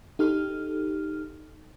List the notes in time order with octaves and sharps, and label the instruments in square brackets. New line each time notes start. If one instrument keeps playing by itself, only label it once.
[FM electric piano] D#4 G4 A4 F6